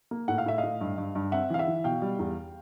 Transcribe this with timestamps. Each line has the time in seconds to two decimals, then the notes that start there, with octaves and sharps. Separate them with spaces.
0.11 A#3
0.28 A2 F#5
0.38 F5
0.46 A2 E5
0.58 D#5 F5
0.63 A2
0.81 G2
0.98 G2
1.15 G2
1.32 C4 E5 F#5
1.50 E3 F5
1.58 E5 F#5
1.68 E3
1.84 B2 F5 G5
2.02 G3
2.19 E2